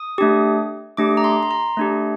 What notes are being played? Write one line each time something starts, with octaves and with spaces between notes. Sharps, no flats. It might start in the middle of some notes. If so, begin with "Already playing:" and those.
Already playing: D#6
A3 D4 G4
A3 D4 G4 D6
A#5
C6
C6
A#5
A3 D4 G4